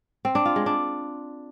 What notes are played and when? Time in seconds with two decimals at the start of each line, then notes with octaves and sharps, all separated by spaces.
0.25 C4
0.35 D4
0.45 F4
0.56 G#3
0.66 D4